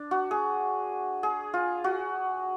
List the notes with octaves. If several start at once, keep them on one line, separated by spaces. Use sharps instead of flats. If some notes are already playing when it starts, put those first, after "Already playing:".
Already playing: D4
F#4
G#4
G#4
F4
F#4